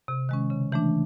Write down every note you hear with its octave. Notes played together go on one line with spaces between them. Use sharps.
C3
D#3 G#3 C#4
C#3
E3 A3 D4